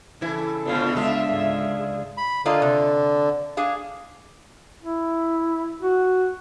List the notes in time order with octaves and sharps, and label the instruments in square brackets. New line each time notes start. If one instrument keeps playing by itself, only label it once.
[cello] C#3 A4 [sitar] E3 [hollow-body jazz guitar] E4
[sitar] G#2 B2 D3 [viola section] B3 F4
[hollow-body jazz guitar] C#2 G#3 [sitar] D3 F4 [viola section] E5
[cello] G#2 G#4
[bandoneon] B5
[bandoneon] D3 [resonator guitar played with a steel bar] A#3 F4 D#5
[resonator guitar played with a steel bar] C3
D4 G#4 F5
[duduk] E4
F#4